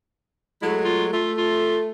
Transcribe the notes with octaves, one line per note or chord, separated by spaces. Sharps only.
F#3 G#3 A3 E4
F4
A3 F4
F4